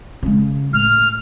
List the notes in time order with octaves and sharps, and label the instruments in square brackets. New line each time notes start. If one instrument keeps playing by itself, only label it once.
[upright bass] C#3 G#3
[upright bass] A2 [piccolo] F6